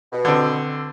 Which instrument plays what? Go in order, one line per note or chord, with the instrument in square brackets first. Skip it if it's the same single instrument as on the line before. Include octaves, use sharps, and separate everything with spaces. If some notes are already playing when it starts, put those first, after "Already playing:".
[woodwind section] B2
[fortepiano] D3 C4